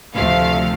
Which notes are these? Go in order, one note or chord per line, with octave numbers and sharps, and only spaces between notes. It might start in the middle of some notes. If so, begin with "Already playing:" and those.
D2 C3 F3 A3 F5